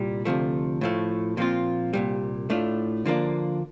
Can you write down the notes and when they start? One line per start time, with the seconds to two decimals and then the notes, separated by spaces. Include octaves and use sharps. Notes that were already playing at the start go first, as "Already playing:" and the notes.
Already playing: C2 A#2 G3
0.25 D2 C3 F3 A3
0.81 A2 F3 A3
1.37 A#2 F3 C4 F4
1.93 C2 A#2 G3
2.50 A2 A3 D4 F4
3.05 D3 F3 A#3 D4